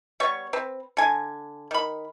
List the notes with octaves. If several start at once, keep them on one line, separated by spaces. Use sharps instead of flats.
G3 B3 C#5 C#6
C4 B4
D3 G#5
D#3 B5